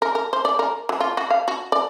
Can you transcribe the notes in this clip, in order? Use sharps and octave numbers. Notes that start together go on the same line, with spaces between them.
A#4
A#4
C5
D5
A#4
F#3
F4
F#4
F5
F#4
D5